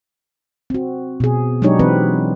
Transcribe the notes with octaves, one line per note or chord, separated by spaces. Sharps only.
C4 F#4
B2 G#4
F#3 G#3 D4 D#4 G4 C#5
E3 C4 B4